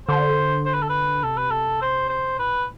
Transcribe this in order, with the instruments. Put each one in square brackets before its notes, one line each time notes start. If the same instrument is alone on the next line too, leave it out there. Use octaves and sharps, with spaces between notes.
[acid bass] D3 [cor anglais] C5
[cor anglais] C5
B4
A4
B4
[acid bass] C3 [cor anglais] A4
[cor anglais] B4
A4
C5
C5
[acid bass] A2 [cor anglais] B4